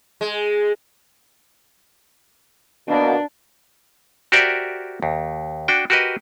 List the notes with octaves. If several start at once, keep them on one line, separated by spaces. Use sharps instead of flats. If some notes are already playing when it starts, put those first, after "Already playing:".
G#3
B2 A#3 D4 D5
F#4 G4 A#4 C5 D5 E5
D#2
D4 F#4 G5
F#4 G4 A#4 B4 D#5